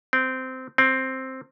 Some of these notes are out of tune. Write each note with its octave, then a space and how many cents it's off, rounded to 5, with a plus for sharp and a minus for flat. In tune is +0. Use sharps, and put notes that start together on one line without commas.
C4 -15
C4 +5